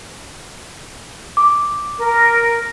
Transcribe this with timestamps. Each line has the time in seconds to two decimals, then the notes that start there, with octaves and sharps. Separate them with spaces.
1.37 D6
1.99 A#4